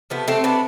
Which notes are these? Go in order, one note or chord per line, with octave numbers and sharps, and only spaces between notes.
C3 F3 A3 B3
A3 C4
B3 D4